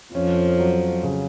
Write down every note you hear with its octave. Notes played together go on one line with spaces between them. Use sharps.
F2 F3 C#4
F#3
C#3